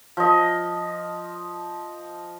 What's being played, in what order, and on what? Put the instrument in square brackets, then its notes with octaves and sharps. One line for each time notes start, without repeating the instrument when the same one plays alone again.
[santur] F3 D#5